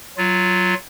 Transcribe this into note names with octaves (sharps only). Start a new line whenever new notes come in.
F#3 F4